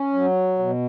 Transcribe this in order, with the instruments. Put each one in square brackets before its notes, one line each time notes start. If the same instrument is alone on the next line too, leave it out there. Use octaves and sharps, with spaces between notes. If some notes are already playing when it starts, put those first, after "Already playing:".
Already playing: [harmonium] C#4
F#3
B2